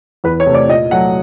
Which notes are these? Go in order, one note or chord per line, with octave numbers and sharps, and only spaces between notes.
E2 B4
C#5
C3 E3 A3
D5
A#2 D#5
F#3 A3 F#5